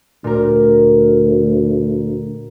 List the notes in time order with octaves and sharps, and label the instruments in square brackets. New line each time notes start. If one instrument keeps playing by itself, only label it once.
[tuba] D2 [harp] A#2 A#4